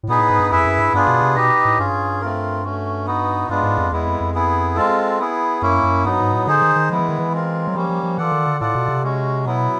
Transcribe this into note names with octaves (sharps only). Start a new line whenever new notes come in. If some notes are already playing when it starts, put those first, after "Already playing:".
A2
A#2 B3 D#4 G#4 B4
A2
G#2
G2
F2 E4 G#4 B4 E5
F#2
G2
G2 B3 D4 F4 G#4
B2
C3
B2 D#4 G4 B4 D#5
A2
G2 C#4 F4 G#4
A3 C4 F4 A#4
A3 C#4 F#4
B3 D#4 F#4
G2 G#3 B3 D4 F4
G#2
F2
E2 G#3 B3 E4
F2
F2
B3 E4 G#4
G#3 C4 F4 A4
B3 E4 G#4
F#2 A#3 C#4 E4
F#2
G2 F#3 B3 D#4
G#2
A2
D3 D#4 G#4 C5
D#3
D#3
F3 G#3 B3 E4
E3
D#3
E3
G#3 C4 F4 A#4
F#3
F3 G3 A#3 C#4
F3
F3
E3 F4 A4 D5 F#5
D#3
D3
A2 F4 A4 D5 F#5
B2
C3
G#3 C#4 F#4
B2 F#3 B3 E4